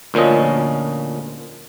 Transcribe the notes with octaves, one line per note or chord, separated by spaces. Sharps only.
D2 A#2 F3 C#4 D#5